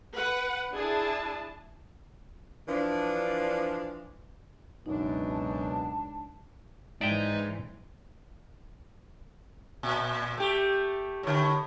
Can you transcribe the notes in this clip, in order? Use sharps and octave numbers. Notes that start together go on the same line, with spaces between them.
B4 F#5
D4 E4 G#4 A5
E3 F3 D4
C#2 F#2 B2 D4 D#4
A5
G#2 E3 G#3 D#4 D5 E5 G5
A#2
A3 G4
A2 D3